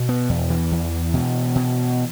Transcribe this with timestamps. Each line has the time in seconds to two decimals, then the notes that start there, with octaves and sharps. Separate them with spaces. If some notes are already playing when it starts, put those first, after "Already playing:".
Already playing: B2
0.09 B3
0.29 E2
0.50 E3
0.72 E2
1.14 B2
1.56 B2